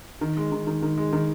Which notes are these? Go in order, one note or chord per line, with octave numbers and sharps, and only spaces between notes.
D#3
G#3
D#3
D#3
D#3
G#3
D#3